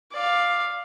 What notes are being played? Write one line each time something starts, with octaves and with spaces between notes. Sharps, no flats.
D5 F5